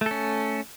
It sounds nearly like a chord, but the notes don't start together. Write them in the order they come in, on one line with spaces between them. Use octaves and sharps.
A3 A4 C#4